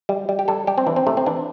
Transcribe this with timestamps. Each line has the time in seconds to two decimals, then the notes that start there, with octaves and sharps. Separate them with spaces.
0.09 G3
0.29 G3
0.39 G4
0.48 G3 A4
0.67 G3 G4
0.78 C4
0.87 E3 D4
0.96 C4
1.07 C3 A3
1.17 C4
1.26 E3 D4